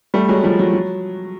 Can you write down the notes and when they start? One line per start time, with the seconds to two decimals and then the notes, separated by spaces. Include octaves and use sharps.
0.14 G3 A3
0.28 F#3 G#3
0.44 F3 G3
0.59 F#3
0.74 F#3